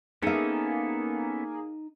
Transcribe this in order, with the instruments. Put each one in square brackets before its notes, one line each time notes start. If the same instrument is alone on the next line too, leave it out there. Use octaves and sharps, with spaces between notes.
[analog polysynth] A#3 G#4 [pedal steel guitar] B3 C#4 A4 [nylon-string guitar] D#4 E5